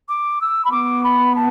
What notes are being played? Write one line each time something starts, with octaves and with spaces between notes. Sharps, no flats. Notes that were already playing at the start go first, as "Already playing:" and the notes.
D6
E6
B5
B3 D6
B5
A5